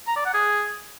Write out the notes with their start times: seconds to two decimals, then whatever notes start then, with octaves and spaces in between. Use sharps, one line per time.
0.07 A#5
0.16 D5
0.25 F#5
0.34 G#4